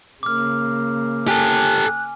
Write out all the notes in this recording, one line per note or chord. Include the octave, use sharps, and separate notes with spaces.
C#3 A#3 D6 F6
G4 A4 G#5 F#6